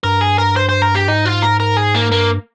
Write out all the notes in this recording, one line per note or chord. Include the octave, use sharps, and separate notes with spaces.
G2 A#4
G#4
A#4
C5
C5
A#4
G4
G#2 D#4
F4
A#4
A#4
G#4
A#3
G2 A#3